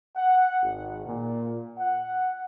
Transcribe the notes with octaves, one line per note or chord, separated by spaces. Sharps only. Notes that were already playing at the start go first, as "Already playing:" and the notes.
F#5
G#1
A#2
F#5